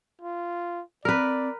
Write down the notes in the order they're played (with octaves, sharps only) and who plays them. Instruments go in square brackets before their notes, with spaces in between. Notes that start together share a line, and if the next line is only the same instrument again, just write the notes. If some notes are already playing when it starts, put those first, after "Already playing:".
[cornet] F4
[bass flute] C4 [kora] A#4 B4 [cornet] D5